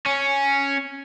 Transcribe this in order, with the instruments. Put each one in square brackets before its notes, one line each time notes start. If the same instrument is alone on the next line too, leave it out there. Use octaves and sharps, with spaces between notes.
[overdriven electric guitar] C#4